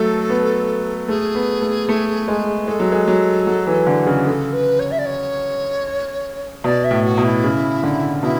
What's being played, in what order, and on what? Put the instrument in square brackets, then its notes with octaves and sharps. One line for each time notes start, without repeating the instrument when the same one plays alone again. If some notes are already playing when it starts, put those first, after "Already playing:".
Already playing: [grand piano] F#3 A3 [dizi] A4
[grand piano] B3
[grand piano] A3 [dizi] G#4
[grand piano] B3
A3
A3
G#3
[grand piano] G#3 [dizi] A4
[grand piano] F#3
G#3
F#3
F#3
E3
D3
C#3
[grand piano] C#3 [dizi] A4
[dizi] B4
C#5
E5
D5
C#5
[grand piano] B2 [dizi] D5
[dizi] E5
[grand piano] A2
[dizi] F#4
[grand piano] B2
[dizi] E4
[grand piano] C#3
D3
[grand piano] B2 [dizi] E4